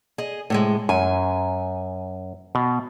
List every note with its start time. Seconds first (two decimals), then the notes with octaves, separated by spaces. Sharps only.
0.18 G#4 D#5
0.50 A2 C3 G#3
0.89 F#2 G#5
2.55 B2